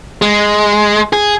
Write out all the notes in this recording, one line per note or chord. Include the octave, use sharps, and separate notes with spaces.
G#3
G#4